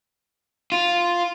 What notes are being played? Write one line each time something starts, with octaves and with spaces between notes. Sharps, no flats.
F4